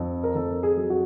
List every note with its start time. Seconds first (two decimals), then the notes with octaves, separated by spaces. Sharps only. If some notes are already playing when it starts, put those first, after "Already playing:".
Already playing: F2
0.23 A#4
0.35 F2 A4
0.63 G#4
0.77 F#3
0.90 F#4